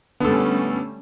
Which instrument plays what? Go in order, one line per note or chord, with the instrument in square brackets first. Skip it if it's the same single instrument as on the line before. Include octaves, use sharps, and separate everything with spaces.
[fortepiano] D3 A4 [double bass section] G3 A3 C#4 [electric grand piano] B3